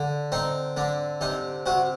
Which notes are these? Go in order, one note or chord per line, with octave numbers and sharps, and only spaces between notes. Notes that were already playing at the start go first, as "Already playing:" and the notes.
Already playing: D3
C4 D#4
D3 D4
C3 D#4
C3 F#4